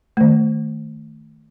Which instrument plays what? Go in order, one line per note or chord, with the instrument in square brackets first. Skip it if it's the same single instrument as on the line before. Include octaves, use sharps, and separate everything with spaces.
[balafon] D#3 A3